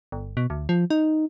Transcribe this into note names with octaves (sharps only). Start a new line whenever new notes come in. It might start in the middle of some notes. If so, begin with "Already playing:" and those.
G1
B2
D2
F3
D#4